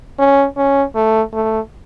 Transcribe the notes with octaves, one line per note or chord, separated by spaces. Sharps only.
C#4
C#4
A3
A3